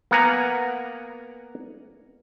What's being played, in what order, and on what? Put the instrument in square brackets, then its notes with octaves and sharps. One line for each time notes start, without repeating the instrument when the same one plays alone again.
[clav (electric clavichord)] A#3 B3 A#4 F#5 G#5 A#5